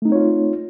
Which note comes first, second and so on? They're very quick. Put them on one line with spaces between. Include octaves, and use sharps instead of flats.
A3 D#4 C4 C#5 F4